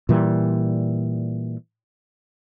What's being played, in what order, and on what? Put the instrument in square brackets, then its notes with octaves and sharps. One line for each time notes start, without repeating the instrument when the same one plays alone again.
[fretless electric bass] A#2 E3 G3